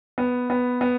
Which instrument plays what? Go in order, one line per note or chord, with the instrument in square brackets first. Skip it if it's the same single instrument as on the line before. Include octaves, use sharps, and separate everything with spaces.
[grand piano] B3
B3
B3